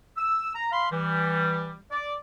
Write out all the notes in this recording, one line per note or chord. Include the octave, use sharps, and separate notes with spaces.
E6
A#5
F5 B5 C6
E3 G3
D5